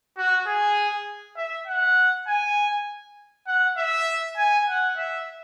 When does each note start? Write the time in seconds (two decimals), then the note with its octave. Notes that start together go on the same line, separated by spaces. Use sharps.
0.17 F#4
0.47 G#4
1.37 E5
1.67 F#5
2.27 G#5
3.47 F#5
3.77 E5
4.37 G#5
4.67 F#5
4.97 E5